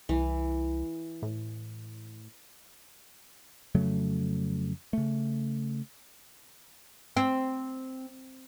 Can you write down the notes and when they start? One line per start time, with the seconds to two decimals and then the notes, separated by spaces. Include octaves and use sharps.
0.09 C2 E3
1.22 A2
3.75 F2 C#3 F#3 A3
4.93 C#3 A3
7.17 C4